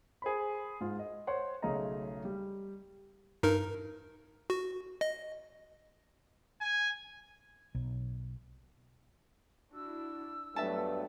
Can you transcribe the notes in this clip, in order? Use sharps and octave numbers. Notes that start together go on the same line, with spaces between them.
G#4 C5 B5
G#2 F4
D#5
C5 C#5 F#5 C6
B1 C#3 A3 D#5 A#5
G3
G2 D#4 A#4
F#4
D#5
G#5
B1
D4 E4 F#4 E6
G2 F#3 A3 B3 E5 A5